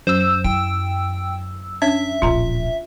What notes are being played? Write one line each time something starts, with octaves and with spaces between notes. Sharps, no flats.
F#2 C5 E6
E4 G5
C#4 D4 C#5 E5
D1 A#1 F4 A#5